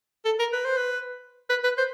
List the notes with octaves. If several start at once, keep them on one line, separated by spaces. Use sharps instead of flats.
A4
A#4
B4
C5
B4
B4
B4
C5